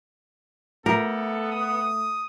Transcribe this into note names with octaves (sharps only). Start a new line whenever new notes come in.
A3 B3 A4 A#4
D#6